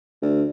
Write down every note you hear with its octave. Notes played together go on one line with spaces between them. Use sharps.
D2